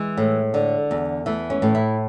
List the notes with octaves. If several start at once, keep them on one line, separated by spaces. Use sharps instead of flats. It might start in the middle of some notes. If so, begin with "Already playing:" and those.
Already playing: E3 G#3
A2
D3
E2
E3 A3
C#4
A2
E4